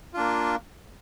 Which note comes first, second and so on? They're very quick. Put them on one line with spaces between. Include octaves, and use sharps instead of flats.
F4 D4 A#3